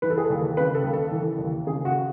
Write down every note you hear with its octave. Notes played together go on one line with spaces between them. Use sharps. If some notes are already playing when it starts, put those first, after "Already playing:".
E3 B4
A4
G#4
A4
D#2
C#3 B4
A4
D#2
A4
E3
D#2
C#3 G#4
F#4